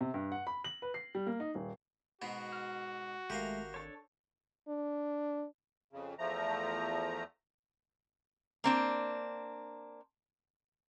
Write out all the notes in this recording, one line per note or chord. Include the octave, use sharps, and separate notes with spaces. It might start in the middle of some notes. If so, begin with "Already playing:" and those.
C3
G2
F#5
B5
F#7
B4
C7
G3
A#3
D#4
D#1
G#2 B2 B3 F#4
F6
G#1 G#3 A3 G4 A#4 F5
D4 A4 C#5
D4
F2 C#3
E2 F3 A3 A#5
A#3 C4 D4